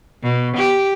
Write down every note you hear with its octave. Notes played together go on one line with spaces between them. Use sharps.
B2
G4